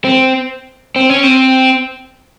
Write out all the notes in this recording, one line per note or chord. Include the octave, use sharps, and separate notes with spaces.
C4
C4
C#4
C4